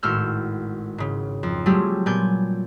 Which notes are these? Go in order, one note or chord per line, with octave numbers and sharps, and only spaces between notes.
G#1 A2 F#4 E6 F6 G6
G#2 C#3
F2
F#3 G3 A3 C4 G4 G#4
A#2 B3 D5 G#5 G6